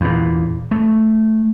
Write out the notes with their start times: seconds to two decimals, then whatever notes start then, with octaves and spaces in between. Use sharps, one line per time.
0.01 E2 A#2
0.71 A3